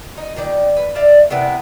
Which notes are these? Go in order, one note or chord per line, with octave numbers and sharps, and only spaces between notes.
D#4
A#2 D#3 D5
B4
D5 E5 F5
C3 A#3 B3 E4